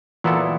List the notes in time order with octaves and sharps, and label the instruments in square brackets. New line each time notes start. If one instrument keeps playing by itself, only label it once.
[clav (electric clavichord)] A#2 F#3 B3 E4 A4 [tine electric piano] E3